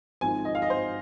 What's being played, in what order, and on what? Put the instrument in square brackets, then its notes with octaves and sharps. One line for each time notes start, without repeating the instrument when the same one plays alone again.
[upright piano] G#1 G#2 F3 C4 G#5
D#5
F5
D#5
C5